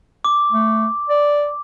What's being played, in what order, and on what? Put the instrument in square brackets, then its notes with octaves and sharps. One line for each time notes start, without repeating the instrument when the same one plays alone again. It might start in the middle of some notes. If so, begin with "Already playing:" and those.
[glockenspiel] D6
[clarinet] A3
D5